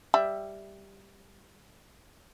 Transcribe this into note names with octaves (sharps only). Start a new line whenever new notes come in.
G3 E5